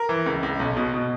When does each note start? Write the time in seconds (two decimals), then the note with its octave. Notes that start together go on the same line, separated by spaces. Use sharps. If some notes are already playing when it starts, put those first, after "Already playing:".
Already playing: A#4
0.09 E3
0.26 C#2
0.43 C#2
0.60 B1
0.77 B2
0.94 B2